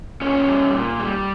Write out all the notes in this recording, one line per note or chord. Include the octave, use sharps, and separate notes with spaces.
A#2 C#4 C#5
G3
A#2
G3